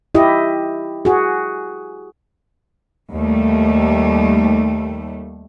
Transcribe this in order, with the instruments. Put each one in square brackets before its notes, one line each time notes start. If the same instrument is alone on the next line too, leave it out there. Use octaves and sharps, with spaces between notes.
[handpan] E4 G4 D#5
F#4 G#4
[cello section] D#2 G3 A3